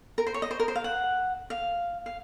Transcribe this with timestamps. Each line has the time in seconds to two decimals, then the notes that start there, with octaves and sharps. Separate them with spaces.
0.18 A#4
0.27 C5
0.34 C#5
0.42 D#5
0.51 C5
0.60 A#4
0.68 C5
0.76 F5
0.84 F#5
1.50 F5
2.06 F5